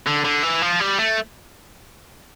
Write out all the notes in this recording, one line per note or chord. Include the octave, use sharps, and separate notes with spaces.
D3
D3
E3
F3
G3
A3